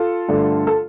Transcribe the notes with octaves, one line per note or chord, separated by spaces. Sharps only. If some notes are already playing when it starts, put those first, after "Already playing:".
Already playing: F4 A4
G2 D3 A3
A4